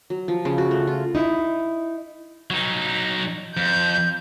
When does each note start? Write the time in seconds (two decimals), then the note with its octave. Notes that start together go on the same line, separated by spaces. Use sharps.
0.10 F#3
0.28 F3
0.45 C#3
0.58 F#4
0.71 A3
0.87 F4
1.15 D#4 E4
2.50 F#3 D#4
3.57 F2 G6